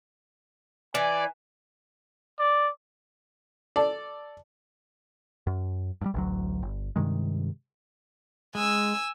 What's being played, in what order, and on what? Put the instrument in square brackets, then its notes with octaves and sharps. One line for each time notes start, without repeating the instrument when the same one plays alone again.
[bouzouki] E3 [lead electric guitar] D5 [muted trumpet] G#5
[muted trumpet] D5
[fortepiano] A4 D5
[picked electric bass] F#2
G2 G3
A1 D2 F#3
G1
G2 C3 D#3 G#3
[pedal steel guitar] G#3 [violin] G#5 E6